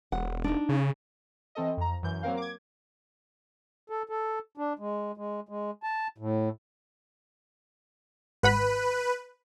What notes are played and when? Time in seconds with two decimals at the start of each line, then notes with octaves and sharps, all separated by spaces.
0.12 E1 F#5
0.44 D4 D#4
0.69 C#3
1.55 E3 C4 A4 D#5
1.77 F2 A#5
2.02 F#2 E3 G6
2.23 F#3 A#3 C4 A#4 F5
2.37 D6 G#6
3.90 A4
4.09 A4
4.57 D4
4.79 G#3
5.17 G#3
5.49 G#3
5.83 A5
6.18 A2
8.43 G#1 B4 F#5 B5